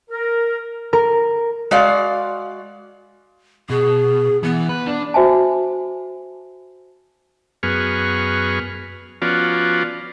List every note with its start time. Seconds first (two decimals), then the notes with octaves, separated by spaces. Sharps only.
0.10 A#4
0.93 A#4
1.71 G#3 F#4 D5 F5
3.70 B2 G#4
4.43 E3 B3
4.69 B4
4.87 D4
5.14 F#4 C5 E5 G#5 A5
7.63 F#2 B3 G#4 C#6 F6
9.22 F3 B3 C#4 F4 F#4 D5